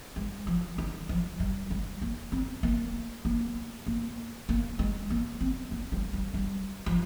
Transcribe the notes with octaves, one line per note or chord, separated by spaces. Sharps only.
G#3
F3
D#3
F3
G3
G#3
A#3
C4
A#3
A#3
A#3
A#3
G#3
A#3
C4
A#3
G3
G3
G3
F3